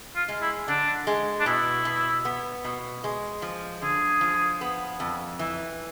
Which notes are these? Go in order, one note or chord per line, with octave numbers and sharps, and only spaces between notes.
F4
G#3
E4
D3 D4
G#3
D4
B2 E4
B2
B3
B2
G#3
F3
D3 G#4
F3
B3
F2
E3